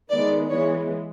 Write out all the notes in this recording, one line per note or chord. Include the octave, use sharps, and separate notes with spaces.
D#3 G#3 B3 D5
E3 G#3 B3 C#5